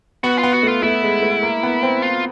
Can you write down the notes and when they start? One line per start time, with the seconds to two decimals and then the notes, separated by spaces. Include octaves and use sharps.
0.24 B3 F#4
0.38 F4
0.43 B3
0.54 F#4
0.63 A3
0.68 F4
0.82 A3 E4
1.03 G#3
1.23 A3
1.43 A#3
1.63 B3
1.83 C4
2.02 F4